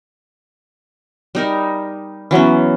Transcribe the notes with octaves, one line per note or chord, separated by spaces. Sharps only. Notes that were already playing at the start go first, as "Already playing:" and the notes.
G3 D#4 A#4
E3 F#3 B3 C#4